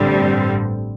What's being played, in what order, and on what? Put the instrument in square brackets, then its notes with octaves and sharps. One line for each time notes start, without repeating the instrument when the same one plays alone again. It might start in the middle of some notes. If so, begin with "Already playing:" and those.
Already playing: [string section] A1 G2 D3 G3 C4